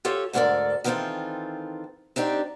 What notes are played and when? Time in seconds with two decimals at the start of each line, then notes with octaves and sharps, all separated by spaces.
0.05 F4 G4 A4 C#5
0.33 D2 G#2 D3 A4 A#4 D5
0.84 D#3 E3 B3 C4 F4 A4
2.16 C4 D4 D#4 G4